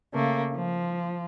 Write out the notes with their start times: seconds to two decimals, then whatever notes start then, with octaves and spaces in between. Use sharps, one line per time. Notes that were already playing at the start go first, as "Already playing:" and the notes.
0.13 C#3 A3 A#3
0.56 F3